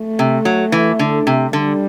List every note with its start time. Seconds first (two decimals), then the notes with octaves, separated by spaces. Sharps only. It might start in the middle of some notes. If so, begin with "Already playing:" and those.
Already playing: A3
0.19 C3
0.45 F#3
0.72 E3
0.99 D3
1.27 C3
1.53 D3 G3